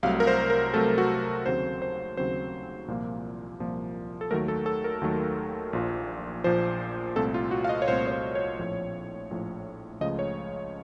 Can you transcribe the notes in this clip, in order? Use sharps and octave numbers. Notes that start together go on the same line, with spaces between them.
C2 C3 F#3 A3 F5
A#4
C5
A#4
C2 C3 F#3 A3 A4
F#4
D#2 C#3 F#3 C4 C5
C5
D#2 C#3 F#3 C4 C5
C2 A#2 F3 A#3
C2 A#2 F3 A#3
A4
D#2 D#3 F#3 A3 A#4
A4
A4
A#4
D#2 D#3 F#3 A3
A#1 A#2 F3
A#1 A#2 F3 C5
C2 A#2 A3 C4 A4
F4
F#4
F5
D#5
C#5
C2 A#2 A3 C4 C5
C#5
C5
C#5
A#1 A2 F3
A#1 A2 F3
C#2 C#3 F3 A3 D#5
C#5